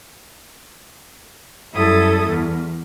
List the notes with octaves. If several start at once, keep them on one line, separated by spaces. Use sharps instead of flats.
F#2 G3 E4 A4 D#6 G#6
E2